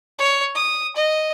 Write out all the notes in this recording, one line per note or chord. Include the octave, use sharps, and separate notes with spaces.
C#5
D#6
D#5